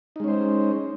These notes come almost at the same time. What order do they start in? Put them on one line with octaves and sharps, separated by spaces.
D#4 G#3 C#4 C5